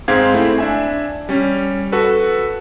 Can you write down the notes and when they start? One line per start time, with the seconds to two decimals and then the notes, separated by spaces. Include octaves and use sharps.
0.08 G#2 G#3 C4 F5 G#6
0.34 A3 C4 E4
0.58 D4 E5 G#5
1.29 G3 C#4
1.92 F#4 A4 B4